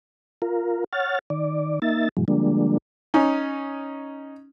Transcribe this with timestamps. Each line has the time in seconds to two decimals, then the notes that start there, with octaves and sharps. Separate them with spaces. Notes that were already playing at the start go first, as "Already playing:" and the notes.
0.42 F4 A#4
0.93 C#5 F#5 F6 A6
1.30 D#3 D5
1.82 A#3 D#4 E5 A6
2.17 G2 B2 E3 F#3 G#3
2.28 D3 F3 G3 G#3 A#3 D4
3.14 C#4 D#4